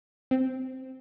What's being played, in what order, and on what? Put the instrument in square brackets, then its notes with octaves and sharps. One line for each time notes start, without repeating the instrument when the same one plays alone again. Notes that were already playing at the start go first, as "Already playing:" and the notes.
[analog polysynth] C4